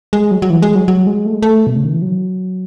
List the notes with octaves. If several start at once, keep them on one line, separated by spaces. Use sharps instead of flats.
G#3
F#3
F#3
E3
G#3
F#3
F#3
G#3
A3
G#3
A3
B2
C#3
D#3
E3
F#3